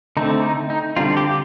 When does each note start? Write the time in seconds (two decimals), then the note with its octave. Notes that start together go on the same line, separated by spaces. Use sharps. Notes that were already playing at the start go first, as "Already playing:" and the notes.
0.17 D3 A3 C4 D#4
0.43 D#4
0.70 D#4
0.97 D3 G3 C4 F4
1.17 G4